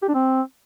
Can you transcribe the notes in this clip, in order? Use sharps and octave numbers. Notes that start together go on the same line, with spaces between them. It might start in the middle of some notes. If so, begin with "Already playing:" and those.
G4
D4
C4